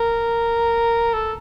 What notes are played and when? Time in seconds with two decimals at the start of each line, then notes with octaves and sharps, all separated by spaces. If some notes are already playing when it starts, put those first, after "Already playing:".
Already playing: A#4
1.14 A4